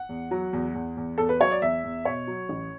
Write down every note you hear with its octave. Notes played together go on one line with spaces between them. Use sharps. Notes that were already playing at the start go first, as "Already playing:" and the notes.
Already playing: F#5
E2
F#3
E2
E2
E2
E2 A4
B4
F#3 C#5
D5
E2 E5
E2
B2 C#5
F#3
A1